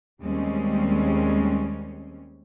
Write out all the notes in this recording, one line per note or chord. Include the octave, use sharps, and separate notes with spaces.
D#2 G3 G#3 C4 C#4